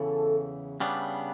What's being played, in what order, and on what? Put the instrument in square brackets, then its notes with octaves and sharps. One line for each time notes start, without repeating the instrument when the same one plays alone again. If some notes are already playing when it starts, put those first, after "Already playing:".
Already playing: [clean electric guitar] E2 C#3 E3 [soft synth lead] A4
[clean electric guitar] C#3 G3 B3 D4